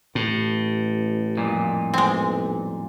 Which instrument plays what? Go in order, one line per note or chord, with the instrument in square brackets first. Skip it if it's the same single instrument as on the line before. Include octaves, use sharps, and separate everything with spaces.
[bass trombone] A1 [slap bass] A2
[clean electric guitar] C2 F2 A#2
[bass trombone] B1 [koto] G#3 C4